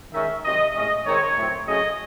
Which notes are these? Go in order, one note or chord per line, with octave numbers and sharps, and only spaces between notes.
D#3 G#3 C#4 E5
C3 D#3 F#3 D#5
A2 G#3 C#4 D#5
D#3 G#3 C4 C#5
A2 F#3 C4
C#3 F#3 A3 C#4 D#5